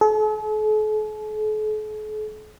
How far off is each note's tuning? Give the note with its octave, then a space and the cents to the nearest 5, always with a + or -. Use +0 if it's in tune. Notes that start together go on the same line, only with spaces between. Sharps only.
A4 -45